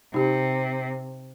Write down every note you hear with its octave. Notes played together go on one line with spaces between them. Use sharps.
C3 D#4 G4